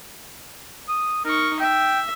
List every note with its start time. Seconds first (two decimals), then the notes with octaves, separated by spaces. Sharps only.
0.88 D#6
1.25 D#4 A#4 C#6
1.60 E5 G5